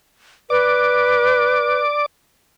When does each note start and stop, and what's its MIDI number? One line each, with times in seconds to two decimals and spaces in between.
0.50 1.80 71
0.50 2.06 74
0.50 2.06 86